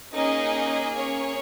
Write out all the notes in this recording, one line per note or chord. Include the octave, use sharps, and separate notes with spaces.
A#3 C#4 D#4 G#4 D#5
C#4 C#5